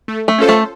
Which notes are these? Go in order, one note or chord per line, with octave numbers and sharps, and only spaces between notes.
A3
A3
C#4 F4 A4 C5
A3